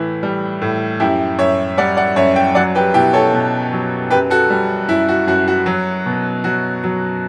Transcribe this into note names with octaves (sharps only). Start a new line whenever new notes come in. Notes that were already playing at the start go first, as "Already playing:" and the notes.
Already playing: A2 E3 E4
G3
A2
F#2 E4 G4
F#2 C#5 E5
G3 D5 F#5
D5 F#5
F#2 C#5 E5
E5 G5
F#3 D5 F#5
G4 B4
B2 E4 G4
A4 C#5
B2
F#3
F#2 G4 B4
F#4 A4
G3
F#2 E4
F#4
F#2 F#4
F#4
F#3
B2
F#3 F#4
F#3